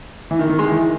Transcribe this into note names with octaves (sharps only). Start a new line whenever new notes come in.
E3
D#3
D#3
G#3
E3